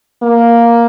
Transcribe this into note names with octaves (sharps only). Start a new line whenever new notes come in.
A#3